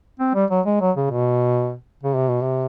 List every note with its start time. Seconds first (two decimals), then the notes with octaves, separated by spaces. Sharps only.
0.20 C4
0.35 G3
0.51 F#3
0.66 G#3
0.81 F#3
0.97 C#3
1.11 B2
2.03 C#3
2.16 C3
2.29 B2
2.42 C3